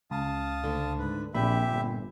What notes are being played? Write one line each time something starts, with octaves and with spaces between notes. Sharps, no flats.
C#2 C#3 F5 A5 D#6
D2 D3
G#2 B4
A#1 A#2 C4 G4 E5 B5
G1